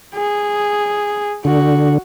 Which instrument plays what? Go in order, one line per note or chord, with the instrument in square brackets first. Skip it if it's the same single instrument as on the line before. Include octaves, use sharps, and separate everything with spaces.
[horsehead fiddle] G#4
[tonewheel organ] D3 [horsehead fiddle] F#4